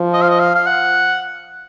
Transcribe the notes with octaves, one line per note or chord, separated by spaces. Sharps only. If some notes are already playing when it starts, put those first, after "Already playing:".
Already playing: F3
D#5
F5
D#5
F5
F5
F#5